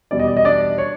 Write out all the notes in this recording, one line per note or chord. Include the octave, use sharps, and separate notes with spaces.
E2 B2 G3 D5
D#5
D5
D#5
D4 D5
C#5